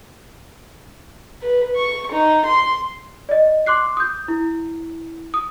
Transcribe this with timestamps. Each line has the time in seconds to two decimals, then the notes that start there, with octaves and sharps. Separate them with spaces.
1.42 B4
1.76 C#6
2.12 D#4
2.45 C6
3.29 D5 D#5
3.66 C6 D6 F#6 C7
3.97 D#6 G6
4.28 E4
5.34 D#6